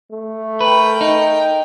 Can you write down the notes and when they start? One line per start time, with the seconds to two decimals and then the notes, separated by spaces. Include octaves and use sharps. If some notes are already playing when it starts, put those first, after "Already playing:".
0.11 A3
0.61 A#4 B4 G5
1.01 D#4